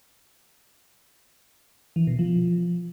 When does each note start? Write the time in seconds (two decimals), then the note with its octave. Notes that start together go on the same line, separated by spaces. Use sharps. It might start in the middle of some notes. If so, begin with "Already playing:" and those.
1.96 E3
2.07 B2
2.19 F3